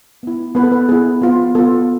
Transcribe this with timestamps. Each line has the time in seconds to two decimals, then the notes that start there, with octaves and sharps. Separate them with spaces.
0.23 B3 E4
0.55 B3 E4 B4
0.64 A4
0.72 B3 B4
0.89 B3 E4 G#4
1.22 B3 F4
1.55 B3 F4 A4